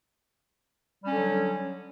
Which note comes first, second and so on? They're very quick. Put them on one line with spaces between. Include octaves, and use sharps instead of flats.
G3 C#4 D3 F#3